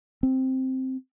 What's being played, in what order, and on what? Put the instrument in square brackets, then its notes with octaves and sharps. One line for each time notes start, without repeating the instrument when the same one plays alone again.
[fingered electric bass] C4